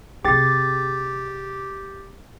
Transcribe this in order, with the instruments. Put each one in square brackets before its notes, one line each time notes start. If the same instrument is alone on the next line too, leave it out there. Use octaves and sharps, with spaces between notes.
[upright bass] C3 C4 [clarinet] G4 [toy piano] G#4 G5 [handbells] D6 A6